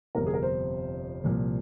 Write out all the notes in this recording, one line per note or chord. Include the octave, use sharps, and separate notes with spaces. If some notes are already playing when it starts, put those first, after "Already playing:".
G1 F2 C3 A#4
G#4
A#4
C5
C2 A#2 F3